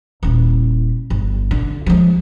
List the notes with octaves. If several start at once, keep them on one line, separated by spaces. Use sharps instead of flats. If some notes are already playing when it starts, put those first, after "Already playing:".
D#1 E4
G1
D3
F3 G#3